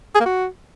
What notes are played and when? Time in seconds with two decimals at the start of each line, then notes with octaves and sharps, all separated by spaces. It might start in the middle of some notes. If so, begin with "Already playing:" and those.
0.15 G#4
0.20 A#3
0.25 F#4